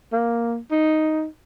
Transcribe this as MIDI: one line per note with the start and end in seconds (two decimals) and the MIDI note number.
0.13 0.57 58
0.71 1.25 63